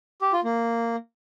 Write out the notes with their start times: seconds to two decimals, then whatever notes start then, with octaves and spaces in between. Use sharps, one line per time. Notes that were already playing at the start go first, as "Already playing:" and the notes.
0.22 G4
0.33 F4
0.44 A#3